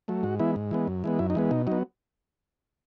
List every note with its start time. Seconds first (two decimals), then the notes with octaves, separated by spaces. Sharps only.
0.08 F#3 A3
0.23 G#2 F#4
0.39 E3 G#3 B3 E4
0.56 G#2
0.71 E3 G#3 B3
0.87 F#2
1.04 E3 G#3 B3
1.19 F#2 E4
1.30 D#4
1.35 E3 G#3 B3
1.51 B2 D#4
1.67 F#3 B3 D#4